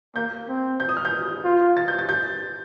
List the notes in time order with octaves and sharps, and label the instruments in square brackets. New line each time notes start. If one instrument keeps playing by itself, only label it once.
[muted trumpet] A#3 [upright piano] G6
[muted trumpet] C4
[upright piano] G6
D#6
F6
G6
[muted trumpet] F4
[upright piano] A6
G6
A6
G6